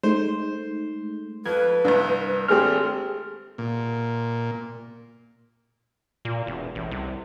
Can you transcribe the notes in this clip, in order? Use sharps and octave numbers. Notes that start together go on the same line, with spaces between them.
G#3 A3 D#4 C5
F2 B4 G#6
C2 G2 D4
G#1 A3 C4 G4 G#4 F6
A#2
A#2
E1
A1
C2